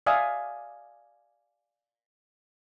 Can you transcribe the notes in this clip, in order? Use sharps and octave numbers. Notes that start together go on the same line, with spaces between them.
D5 E5 F5 G#5 D#6